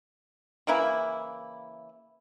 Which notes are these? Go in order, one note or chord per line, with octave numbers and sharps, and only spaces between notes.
C#3 E3 A#3 E4